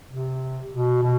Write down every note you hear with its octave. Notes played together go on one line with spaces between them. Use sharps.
C3
B2
B2